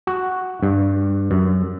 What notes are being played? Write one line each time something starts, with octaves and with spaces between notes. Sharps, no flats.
F#4
G2
F#2